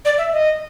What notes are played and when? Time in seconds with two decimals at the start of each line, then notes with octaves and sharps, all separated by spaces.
0.05 D5
0.18 E5
0.32 D#5